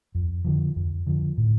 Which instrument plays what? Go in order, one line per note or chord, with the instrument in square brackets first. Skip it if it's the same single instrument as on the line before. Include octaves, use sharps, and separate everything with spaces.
[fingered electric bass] F2
D3 F3
F2
D3 F3
A2